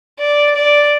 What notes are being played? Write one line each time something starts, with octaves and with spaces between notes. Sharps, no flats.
D5
D5